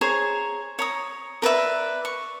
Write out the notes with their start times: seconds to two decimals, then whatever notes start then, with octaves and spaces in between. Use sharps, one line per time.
0.01 G#4 C5 C#5 A#5
0.79 C#5 A#5 D#6
1.42 A#4 B4 D5 E5
2.05 C#6